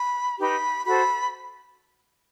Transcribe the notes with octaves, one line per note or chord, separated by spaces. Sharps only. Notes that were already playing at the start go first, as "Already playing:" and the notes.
Already playing: B5
D#4 G4 B4 B5
F#4 A4 C5 B5